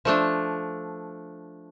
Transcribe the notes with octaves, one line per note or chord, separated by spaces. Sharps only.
F3 A3 D4